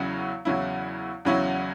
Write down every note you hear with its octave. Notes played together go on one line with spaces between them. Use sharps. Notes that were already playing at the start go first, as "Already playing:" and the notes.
Already playing: E2 C#3 F#3 C#4 E4
E2 C#3 F#3 C#4 E4
E2 C#3 F#3 C#4 E4